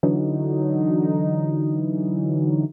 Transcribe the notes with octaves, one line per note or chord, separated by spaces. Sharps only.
D3 E3 F#3 D#4